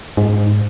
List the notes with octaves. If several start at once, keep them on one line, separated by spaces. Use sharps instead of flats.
G#2